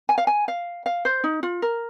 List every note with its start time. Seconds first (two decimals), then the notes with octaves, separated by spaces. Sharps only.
0.09 G#5
0.18 F5
0.27 G#5
0.48 F5
0.86 F5
1.05 C5
1.24 D#4
1.43 F4
1.62 A#4